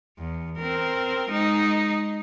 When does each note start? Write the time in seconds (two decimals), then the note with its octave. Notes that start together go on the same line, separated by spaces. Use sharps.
0.19 E2
0.59 C4 A#4
1.30 G#3 D#4